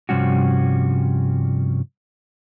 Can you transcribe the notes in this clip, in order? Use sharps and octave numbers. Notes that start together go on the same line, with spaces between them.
G2 C3 F3 G3 C#4 F#4